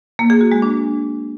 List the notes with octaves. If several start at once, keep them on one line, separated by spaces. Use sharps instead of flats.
A#3
G#4
F#4
G#3
D4